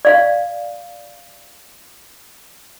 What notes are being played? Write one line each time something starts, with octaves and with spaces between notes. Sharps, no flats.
D5 F5